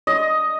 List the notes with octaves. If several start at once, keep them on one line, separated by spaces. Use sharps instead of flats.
D#5